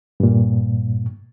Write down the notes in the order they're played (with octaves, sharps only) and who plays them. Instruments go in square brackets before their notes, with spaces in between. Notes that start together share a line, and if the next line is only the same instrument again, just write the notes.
[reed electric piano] G2 A#2